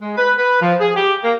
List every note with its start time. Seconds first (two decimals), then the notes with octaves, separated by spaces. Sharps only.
0.02 G#3
0.18 B4
0.38 B4
0.61 F3
0.80 G#4
0.96 G4
1.24 A#3